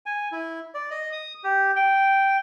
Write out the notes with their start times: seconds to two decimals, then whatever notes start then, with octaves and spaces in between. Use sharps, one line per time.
0.06 G#5
0.32 E4
0.74 D5
0.91 D#5
1.12 D#6
1.44 G4
1.76 G5